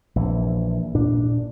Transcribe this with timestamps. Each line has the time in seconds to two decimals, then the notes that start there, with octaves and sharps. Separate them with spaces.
0.16 A#1 E3
0.95 A#2 D4